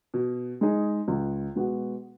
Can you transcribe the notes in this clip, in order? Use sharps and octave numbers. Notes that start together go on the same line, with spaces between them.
B2
G#3 D#4 G#4
C#2
B2 G#3 B3 F#4